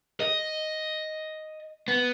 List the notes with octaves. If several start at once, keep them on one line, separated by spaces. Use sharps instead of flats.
D#5
B3